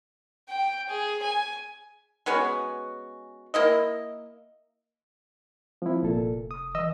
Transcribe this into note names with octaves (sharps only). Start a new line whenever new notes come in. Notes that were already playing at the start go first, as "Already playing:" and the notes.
G5
G#4
G#5
G#3 B3 C#4 F#4
A#3 E4 D#5
F3 C4 E4
F1 A#2 A4
D#6
E3 D#5 E6